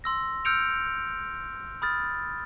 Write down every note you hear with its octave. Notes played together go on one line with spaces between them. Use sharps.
C6 E6 A#6
E6 F6 G6 C#7 D7 F7
B5 D#6 F6 A6